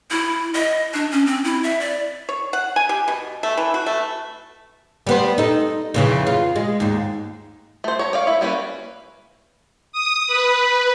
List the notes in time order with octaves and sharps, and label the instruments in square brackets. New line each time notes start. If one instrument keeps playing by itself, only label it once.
[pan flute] E4
D#5
D4
C#4
C4
E4
E5
D5
[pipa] C#5
F#5
G#5
G4
B2
A3
E3
F#4
A3
[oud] G3 B3 C5
D#4 A4
F2 C#3 E3
F4
G#3
D#2 G#2
[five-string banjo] A3 C5
C#5 A#5
C#5 D5 F5
E4 E5
G3 A#3 C#4 B4
[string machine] D#6
B4